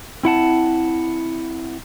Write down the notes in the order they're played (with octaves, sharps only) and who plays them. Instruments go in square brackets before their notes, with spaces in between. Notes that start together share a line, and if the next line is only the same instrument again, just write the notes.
[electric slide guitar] C4 E4 F#5 A5